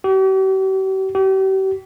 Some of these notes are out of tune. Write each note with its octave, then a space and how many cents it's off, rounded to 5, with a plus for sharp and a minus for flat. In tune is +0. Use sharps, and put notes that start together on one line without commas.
G4 -45
G4 -40